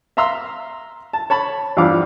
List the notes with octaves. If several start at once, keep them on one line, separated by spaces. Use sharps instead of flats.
E5 F5 A#5 C6 E6
A5
C#5 A5 B5 C#6
E2 G2 F3 F5 D6